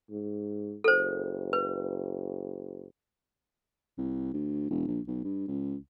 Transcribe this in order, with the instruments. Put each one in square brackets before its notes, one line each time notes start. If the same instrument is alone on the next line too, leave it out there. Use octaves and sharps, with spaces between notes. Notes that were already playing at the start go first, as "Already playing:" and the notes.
[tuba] G#2
[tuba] F#1 [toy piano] A4 C5
[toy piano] B4
[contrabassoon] C2
D2
E1
A#1
B1
G2
C#2